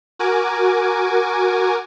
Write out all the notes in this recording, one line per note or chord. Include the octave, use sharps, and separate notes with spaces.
F#4 A#4 G#5 D6